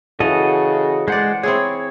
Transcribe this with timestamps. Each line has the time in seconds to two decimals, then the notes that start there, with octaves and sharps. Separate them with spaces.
0.20 C#3 E3 F#4 A4 D#5
1.08 G#3 C5 D5 F#5
1.43 C4 E4 G#4 C#5